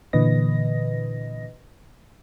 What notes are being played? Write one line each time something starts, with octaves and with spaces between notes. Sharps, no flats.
A#2 D3 E3 B4 D#5 A#6